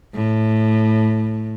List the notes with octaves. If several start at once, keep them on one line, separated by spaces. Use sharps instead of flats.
A2